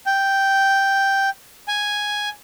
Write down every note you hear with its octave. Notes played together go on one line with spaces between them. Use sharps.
G5
G#5